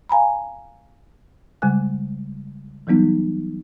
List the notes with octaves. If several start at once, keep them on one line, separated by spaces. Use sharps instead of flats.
F5 G#5 A#5 B5
C#3 G3 G#3 G#5 F#6
E3 F#3 G3 B3 D#4